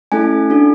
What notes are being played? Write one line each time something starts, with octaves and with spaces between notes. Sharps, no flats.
A3 C#4 E4 A4 G#5
D4 F#4 A4